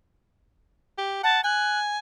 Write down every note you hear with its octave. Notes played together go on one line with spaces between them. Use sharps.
G4
F#5 A5
G#5 F#6